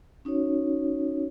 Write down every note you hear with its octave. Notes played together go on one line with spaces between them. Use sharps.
C#4 D#4 F#4 C#5